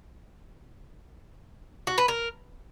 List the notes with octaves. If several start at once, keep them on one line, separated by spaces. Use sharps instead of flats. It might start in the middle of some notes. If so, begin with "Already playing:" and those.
F#4
B4
A#4